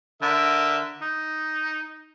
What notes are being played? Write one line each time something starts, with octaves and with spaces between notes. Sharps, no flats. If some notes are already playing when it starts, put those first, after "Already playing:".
D3 A#4 E5
D#4